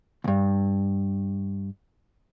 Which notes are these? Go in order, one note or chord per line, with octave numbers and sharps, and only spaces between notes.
D2 G2